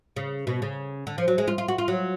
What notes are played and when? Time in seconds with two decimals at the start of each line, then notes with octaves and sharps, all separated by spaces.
0.16 C#3
0.47 B2
0.62 C#3
1.07 D3
1.18 F3
1.28 F#3
1.38 G#3
1.48 F4
1.58 F4
1.68 F#4
1.78 F4
1.88 F#3